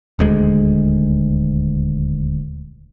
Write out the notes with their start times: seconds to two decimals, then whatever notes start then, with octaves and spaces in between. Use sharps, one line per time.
0.19 D#1 D2 G#3